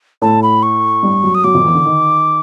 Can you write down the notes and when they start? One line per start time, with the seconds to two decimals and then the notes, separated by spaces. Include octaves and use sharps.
0.22 A2 A3 A5
0.43 B5
0.63 C#6
1.03 G2 G3
1.23 F#2 F#3
1.35 D#6
1.44 F#2 F#3 D6
1.54 F2 F3
1.65 E2 E3
1.75 D3
1.85 D#3